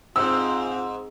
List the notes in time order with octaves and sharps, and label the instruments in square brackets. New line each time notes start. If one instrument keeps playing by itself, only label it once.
[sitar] G#2 [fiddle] C4 C5 [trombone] F4 [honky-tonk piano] E6